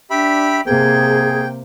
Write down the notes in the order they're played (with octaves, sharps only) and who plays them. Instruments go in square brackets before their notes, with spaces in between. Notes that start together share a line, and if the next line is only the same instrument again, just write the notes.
[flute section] D4 [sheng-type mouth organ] G4 E5 B5
[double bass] C3 A#3 [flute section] G#4 G#6 [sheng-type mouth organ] G5